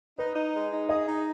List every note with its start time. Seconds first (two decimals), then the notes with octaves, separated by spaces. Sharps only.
0.18 D#4 B4
0.35 D#4
0.54 G#3
0.72 D#4
0.89 G#4 D#5
1.07 D#4